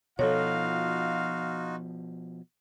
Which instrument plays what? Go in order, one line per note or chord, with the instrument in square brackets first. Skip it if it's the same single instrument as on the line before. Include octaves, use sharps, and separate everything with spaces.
[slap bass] B2 F3 [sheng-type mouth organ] D#4 F4 F#4 [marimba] A4 C#5 [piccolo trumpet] F5